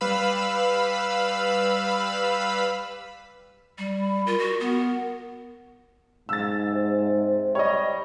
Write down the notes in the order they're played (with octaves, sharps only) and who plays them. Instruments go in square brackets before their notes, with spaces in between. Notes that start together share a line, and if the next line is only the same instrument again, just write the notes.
[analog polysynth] G3 B4 F5 B5 E6
[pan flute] G3
[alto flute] B5
[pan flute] F4 [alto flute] A#4
[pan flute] F#4
B3
[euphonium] G#2 [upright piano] E6 A6
[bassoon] C3
[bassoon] G3 [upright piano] C#5 D#5